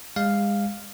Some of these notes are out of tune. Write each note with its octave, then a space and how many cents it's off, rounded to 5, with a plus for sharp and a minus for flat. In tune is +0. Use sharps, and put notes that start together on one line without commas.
G#3 -35 F5 +0